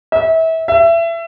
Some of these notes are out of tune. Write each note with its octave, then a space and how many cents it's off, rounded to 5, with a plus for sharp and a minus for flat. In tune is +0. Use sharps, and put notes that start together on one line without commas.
E5 -30
E5 +25